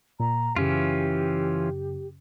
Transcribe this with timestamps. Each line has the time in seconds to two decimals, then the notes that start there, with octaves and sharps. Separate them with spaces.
0.20 A#2 A#5
0.56 F#2 C#3 E3 C#4 F4 G4